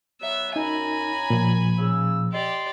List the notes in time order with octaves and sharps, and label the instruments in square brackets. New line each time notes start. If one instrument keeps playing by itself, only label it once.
[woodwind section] F#3 B3 [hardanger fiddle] E5
[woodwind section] F#2 A#5 [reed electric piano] D#4 [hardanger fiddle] G#5 B5
[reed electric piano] A#2 F3
[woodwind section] C#3 E6
[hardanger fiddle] G4 D5 [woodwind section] D#5 C6